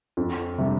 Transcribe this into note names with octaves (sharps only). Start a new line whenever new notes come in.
F2
C3 G3 D4